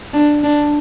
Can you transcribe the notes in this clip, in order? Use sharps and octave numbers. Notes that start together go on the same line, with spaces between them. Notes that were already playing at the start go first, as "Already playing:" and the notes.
D4
D4